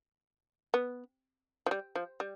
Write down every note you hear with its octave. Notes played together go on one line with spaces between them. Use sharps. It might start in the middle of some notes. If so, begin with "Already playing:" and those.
B3
F3
G3
F3
G3